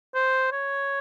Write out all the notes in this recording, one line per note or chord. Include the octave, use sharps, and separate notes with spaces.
C5
C#5